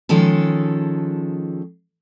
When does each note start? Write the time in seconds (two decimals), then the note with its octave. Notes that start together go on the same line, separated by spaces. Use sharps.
0.09 D#3 F3 G#3 C#4 A4